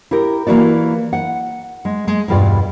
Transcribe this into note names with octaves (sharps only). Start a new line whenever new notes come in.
E4 G4 A#4
E3 A#3 E4 F#4 D5
F#5
G#3
G#3
E2 G2 B2 F4 D5